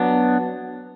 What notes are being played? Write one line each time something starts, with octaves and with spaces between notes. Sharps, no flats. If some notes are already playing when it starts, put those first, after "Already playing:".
Already playing: F#3 B3 D4